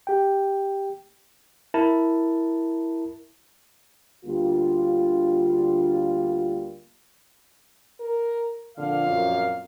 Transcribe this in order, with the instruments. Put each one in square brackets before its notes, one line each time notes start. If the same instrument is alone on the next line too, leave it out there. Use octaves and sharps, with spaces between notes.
[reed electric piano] G4 G5
[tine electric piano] E4 A#4 A5
[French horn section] D2 D3 G3 A#3 F4
[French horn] A#4
[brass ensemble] F2 A#2 F5 [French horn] D3
[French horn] F#2